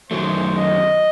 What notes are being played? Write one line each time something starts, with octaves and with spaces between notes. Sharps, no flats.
F#2 D#3 F#3 A3 C5
D#5